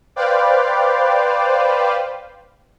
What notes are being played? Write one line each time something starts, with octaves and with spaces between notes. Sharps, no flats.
B4 C5 D5 F5 G5